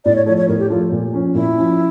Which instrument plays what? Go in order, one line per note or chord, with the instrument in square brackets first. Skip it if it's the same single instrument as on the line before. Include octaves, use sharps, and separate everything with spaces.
[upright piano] A2 [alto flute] D5
[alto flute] C#5
[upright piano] F3 A3 [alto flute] C#5
[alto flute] C#5
[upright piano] A2 [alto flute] A#4
[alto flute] G4
[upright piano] F3 A3 [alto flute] F4
[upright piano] A#2
F3 C#4
[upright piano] A#2 [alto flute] E4
[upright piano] F3 C#4